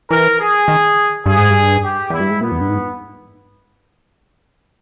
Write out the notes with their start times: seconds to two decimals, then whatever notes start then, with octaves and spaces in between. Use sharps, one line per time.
0.10 E3 A#4
0.38 G#4
0.68 D#3
1.25 G2 G#4
1.38 G#2
1.50 G2
1.84 G4
2.10 E2 E4
2.20 G2
2.30 G#2
2.41 A#2 B3
2.52 E2
2.61 G2
2.69 G#2